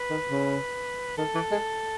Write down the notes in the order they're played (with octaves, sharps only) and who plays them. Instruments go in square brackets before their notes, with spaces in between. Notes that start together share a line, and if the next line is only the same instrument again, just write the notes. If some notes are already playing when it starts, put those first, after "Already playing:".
Already playing: [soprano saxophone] B4
[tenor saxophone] D#3
C#3
[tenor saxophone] D#3 [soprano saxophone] A4
[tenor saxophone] E3
G#3